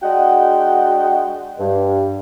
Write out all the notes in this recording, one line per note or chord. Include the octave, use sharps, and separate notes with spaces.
G#3 D4 F#4 D#5 F#5 G5
G2